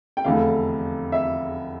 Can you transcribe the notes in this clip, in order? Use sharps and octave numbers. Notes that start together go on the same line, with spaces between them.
G5
F1 E2 D3 A3 F5
E5